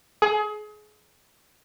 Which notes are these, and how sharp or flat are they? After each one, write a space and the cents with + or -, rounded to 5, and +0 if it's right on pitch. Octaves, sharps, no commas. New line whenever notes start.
G#4 +30